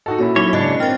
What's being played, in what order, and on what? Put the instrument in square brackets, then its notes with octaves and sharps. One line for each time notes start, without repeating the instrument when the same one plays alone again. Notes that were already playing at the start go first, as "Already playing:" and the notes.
[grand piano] D#4 F#4 A4 [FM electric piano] D#5
[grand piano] A#2 C#4 E4 [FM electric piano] F#4
[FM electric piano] F#3 B6 [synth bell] D#4 F#4 G7 [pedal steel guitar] C#5
[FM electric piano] G#2 [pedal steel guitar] C#3 D4 [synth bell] D#5 F#6
[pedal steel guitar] C4 [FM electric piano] A#4 G5 [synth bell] F6 A6